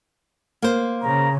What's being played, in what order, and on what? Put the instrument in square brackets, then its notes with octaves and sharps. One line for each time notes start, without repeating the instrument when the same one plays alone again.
[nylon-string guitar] A#3 C5
[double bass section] C#3 [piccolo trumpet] A#5